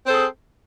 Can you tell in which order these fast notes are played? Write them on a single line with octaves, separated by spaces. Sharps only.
C4 C5 A4 G#4